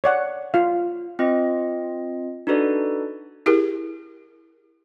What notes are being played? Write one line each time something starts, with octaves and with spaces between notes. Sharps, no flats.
C#5 D5 F#5
F4 F5
C4 F4 D#5
D4 D#4 F#4 A4 B4 D5
E4 G4 G#4 A#4